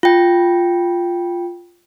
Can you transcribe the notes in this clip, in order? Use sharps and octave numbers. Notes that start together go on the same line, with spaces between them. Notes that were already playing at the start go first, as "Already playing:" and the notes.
F4 G5